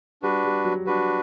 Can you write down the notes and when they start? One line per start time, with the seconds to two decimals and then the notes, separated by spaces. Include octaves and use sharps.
0.22 G3 D4 F#4 B4
0.44 G3
0.65 F#3
0.86 G3 D4 F#4 B4